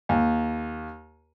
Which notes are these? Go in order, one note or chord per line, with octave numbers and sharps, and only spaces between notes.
D#2